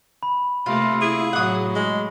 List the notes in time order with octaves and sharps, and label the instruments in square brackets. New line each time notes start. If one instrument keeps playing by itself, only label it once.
[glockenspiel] B5
[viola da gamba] C3 A3 A#3 [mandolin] F4
[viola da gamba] E4 [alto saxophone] G#4
[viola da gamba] A2 F#3 [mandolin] F#5 D#6
[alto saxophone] G#3